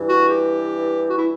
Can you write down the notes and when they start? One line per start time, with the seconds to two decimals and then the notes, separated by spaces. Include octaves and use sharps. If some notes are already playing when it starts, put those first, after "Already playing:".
Already playing: G2 E3
0.09 F#4
0.29 G4
1.10 F#4
1.17 E4